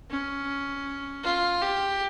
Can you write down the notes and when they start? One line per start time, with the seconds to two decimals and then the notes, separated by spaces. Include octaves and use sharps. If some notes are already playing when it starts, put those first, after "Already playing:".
0.11 C#4
1.24 F4
1.62 G4